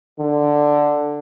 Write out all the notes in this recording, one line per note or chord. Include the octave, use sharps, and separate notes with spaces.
D3